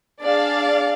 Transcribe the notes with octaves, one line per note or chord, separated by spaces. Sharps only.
D4 G#4 D5 F5